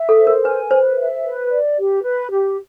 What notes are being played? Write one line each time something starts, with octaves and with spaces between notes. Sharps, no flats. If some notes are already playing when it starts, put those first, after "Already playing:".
Already playing: E5
A4
C5
A#4
B4 G#5
B4 C5
E5
B4
D5
G4
B4
G4